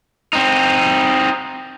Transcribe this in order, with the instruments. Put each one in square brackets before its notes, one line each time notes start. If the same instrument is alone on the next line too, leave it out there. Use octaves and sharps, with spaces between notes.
[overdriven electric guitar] C4 D#4